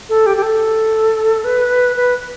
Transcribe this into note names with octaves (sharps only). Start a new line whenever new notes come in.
A4
G4
G4
A4
B4
B4